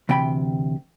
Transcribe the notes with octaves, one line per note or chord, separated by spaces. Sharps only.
D2 C3 E3 G5 A#5 B5